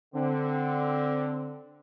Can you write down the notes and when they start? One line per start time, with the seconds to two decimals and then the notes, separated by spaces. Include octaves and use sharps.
0.15 D3 C4